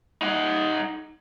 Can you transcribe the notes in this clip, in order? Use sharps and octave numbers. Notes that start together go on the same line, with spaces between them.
D#4 F#5